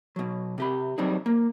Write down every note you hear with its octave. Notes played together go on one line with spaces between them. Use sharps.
B2 F#3
C3 G4 B5
F#3 G3 C4 D4 D#4 G#4
A#3